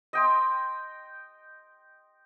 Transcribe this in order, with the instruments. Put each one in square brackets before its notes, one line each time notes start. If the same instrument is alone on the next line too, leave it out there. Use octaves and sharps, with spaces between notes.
[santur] D#5 G5 C6